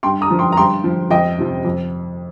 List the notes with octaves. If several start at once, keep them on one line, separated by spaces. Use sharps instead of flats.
G2 G5 C6
A#5 D#6
F3
G5 C6
A#5
G2 G5 C6
F3
F2 D#5 G5
C3 F3
F2